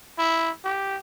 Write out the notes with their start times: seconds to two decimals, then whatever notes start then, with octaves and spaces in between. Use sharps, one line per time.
0.18 E4
0.65 G4